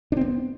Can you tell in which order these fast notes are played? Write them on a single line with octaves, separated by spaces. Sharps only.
D4 C4 B3